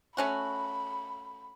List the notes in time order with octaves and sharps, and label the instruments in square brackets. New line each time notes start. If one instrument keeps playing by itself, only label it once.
[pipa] A3 C#4 F#4 [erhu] B5